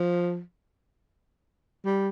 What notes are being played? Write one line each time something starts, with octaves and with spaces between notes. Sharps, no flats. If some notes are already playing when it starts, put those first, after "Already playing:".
Already playing: F3
G3